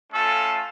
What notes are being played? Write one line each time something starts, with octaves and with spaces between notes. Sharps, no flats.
A3 C#4 F4 A4